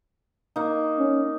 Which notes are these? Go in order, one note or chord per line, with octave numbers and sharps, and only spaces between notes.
A#3 D#4
C#4